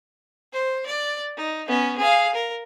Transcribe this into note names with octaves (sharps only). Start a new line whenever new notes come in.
C5
D5
D#4
B3 C#4
G#4 F5
A#4